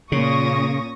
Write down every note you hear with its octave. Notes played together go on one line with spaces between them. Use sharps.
A#2 C#3 A#3 C#4 C#6 D#6 A#6